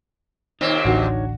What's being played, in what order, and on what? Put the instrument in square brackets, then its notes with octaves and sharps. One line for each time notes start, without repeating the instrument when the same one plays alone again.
[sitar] D#2 A#2 C4 [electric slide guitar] D#4 C#5
[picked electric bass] A1 D2 [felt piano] D4 F#4 F#5